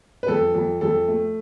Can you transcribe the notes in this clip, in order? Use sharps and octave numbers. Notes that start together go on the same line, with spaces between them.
B4
F2 A4
F2
F2 A4
A3